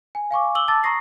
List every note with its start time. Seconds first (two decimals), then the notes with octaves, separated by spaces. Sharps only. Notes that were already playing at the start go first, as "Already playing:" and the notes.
0.15 G#5
0.31 F5 G#5 C#6 D6
0.55 D6 E6 F#7 G7
0.68 A5 D6 E6 A6
0.83 A#5 C#6 D#6 A#6 C7